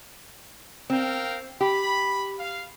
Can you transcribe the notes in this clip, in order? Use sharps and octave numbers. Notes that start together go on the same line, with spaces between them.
C4 A#4 F5 G5
G4 B5
F5